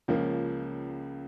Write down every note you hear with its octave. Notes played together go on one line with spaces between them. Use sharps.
C#2 C#3 F3 A#3